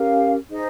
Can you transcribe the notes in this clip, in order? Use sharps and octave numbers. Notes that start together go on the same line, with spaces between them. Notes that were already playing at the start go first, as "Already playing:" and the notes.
Already playing: C#4 G4 A#4 F5
D#4 G#4 C5 D#5